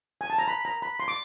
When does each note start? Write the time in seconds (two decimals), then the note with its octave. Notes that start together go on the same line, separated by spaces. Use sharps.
0.21 G#5
0.30 A5
0.38 A#5
0.48 B5
0.65 A#5
0.82 B5
1.00 C6
1.08 D6